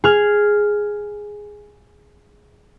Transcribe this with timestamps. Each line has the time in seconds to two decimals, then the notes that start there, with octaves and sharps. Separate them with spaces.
0.04 G#4 F6